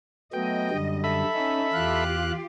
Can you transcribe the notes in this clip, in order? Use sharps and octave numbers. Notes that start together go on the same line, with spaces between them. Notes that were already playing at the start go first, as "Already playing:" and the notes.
F#3 A3 B3 D#5 G5
F#2 D3 G3
A4 E5 B5
C#4 D#4
E2 F4 G4 F5 F#6